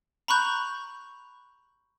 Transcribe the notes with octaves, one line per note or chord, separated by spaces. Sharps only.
A#5 B5 C#6 F#6 G6